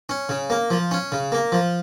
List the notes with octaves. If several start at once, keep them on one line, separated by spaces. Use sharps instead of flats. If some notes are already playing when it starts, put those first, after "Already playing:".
C#4
C#3
A#3
F3
C#4
C#3
A#3
F3